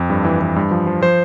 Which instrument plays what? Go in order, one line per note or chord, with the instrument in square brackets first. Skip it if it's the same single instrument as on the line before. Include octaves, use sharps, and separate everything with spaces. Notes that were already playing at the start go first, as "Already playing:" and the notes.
Already playing: [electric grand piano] F2
G2
E3
E3
G2
F3
F3
F3 C5